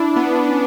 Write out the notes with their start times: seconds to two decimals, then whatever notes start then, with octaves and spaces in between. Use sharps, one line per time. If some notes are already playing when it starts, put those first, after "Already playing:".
Already playing: D4 E4
0.16 B3
0.49 C#4